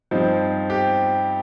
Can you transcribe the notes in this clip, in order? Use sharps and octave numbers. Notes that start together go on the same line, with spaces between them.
G2 F3 C4 D#4
G4